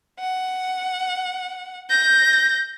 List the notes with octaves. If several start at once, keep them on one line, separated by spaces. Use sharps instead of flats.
F#5
G6 A#6